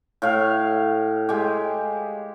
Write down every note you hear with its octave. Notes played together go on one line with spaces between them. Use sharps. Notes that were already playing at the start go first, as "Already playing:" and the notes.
A2 F5
G#3 G4